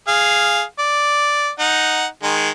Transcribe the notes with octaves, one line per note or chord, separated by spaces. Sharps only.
G#4 F5
D5
D#4 F#5
D#3 G#3